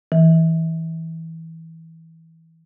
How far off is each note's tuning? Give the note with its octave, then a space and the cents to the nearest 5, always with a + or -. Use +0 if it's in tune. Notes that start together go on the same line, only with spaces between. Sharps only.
E3 -20